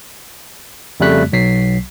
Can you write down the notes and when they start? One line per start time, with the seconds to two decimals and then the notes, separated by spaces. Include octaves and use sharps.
1.00 F2 C#3 G3 A3 F#6 B6
1.32 B1 F#3 B6 C7